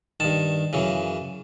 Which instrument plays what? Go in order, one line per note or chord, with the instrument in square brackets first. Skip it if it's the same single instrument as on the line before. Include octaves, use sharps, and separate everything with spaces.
[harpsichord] G2 D#3 A5
F#2 C#3 E3